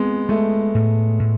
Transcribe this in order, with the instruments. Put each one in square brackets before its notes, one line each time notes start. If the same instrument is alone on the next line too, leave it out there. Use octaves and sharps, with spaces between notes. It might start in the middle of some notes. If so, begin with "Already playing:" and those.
Already playing: [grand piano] G#3 B3 [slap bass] C4
[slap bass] G#3 [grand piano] A3
[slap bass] A2
A2